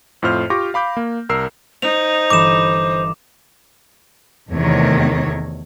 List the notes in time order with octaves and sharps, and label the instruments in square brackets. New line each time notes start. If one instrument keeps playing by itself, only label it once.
[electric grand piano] F2 A2 F4 C5 F6
F4 G4 C#6 D6 A#6
F5 B5 D6 G6
A#3
C2 A#4 E6 C7
[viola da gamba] D#4 [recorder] C5 [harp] F#5 [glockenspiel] F7
[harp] G1 E3 B5 [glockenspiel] D6 E7
[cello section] E2 C3 D#3 A3 C#5